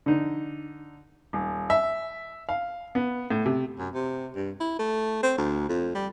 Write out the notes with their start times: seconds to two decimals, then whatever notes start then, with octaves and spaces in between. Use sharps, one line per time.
0.06 D3 D#4
1.33 D#1
1.70 E5
2.49 F5
2.95 B3
3.30 A2
3.46 C3
3.79 F#2
3.94 C3
4.36 G2
4.60 E4
4.79 A3
5.23 C4
5.38 D2
5.69 F2
5.95 G3